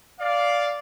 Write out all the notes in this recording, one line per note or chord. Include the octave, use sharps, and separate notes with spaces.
D5 F5